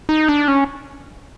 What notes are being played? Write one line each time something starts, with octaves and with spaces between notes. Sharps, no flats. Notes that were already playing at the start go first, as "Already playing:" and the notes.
D#4
D4
C#4